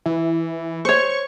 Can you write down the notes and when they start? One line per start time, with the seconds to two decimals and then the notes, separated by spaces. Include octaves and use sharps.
0.06 E3
0.85 C5 C#5 C#6